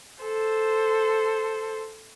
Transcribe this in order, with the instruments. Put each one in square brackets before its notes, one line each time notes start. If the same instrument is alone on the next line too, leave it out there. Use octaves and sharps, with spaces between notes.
[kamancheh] A4 C5